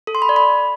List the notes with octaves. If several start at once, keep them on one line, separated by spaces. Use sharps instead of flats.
A4
C6
B5
D5
B5